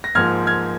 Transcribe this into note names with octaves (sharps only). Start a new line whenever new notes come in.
A#6
G#2 F3 A#3 F6 G#6
F6 G#6